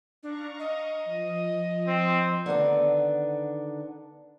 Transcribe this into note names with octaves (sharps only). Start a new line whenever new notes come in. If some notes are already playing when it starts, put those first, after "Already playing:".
D4 F5 A#5 C#6
D#5
F3
C4
D3 D#3 B3 D4